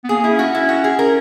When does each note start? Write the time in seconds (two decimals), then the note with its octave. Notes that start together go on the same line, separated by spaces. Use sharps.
0.04 B3
0.09 A#3 G#4
0.24 E4
0.32 C#4
0.39 F#4
0.55 E4
0.69 F#4
0.84 G#4
0.99 C#4 A#4